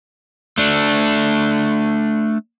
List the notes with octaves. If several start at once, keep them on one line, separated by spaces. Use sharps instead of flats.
A3 D4